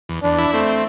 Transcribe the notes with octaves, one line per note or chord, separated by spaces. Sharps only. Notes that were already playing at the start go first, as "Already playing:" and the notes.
E2
E2 D4
E4
A3 C4